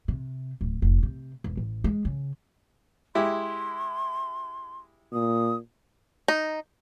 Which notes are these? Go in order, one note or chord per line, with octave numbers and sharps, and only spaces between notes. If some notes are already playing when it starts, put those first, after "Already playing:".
C3
D1
F1
C3
E1
A1
G#3
C#3
G#3 E4 G4 C6
A#2 D#6
D#4